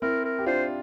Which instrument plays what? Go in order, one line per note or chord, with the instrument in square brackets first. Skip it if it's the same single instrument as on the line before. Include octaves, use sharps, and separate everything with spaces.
[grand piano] C4 E4 [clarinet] A#4
[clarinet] A#4
[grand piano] G4
[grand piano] D4 F4 [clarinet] C5